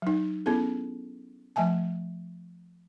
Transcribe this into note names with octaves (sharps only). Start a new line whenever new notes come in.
F#3 D#4
B3 C#4 E4 G#4 A4
F3 A3 E5 G#5 A5